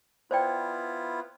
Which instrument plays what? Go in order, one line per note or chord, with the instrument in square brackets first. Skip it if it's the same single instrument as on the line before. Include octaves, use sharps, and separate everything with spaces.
[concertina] B3 E4 F4 [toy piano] C5 D5 G5